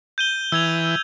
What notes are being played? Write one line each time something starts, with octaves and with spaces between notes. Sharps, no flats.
G6 D#7 G7
E3 E6 G#6 F7